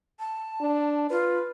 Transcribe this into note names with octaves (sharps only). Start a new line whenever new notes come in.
A5
D4
F4 B4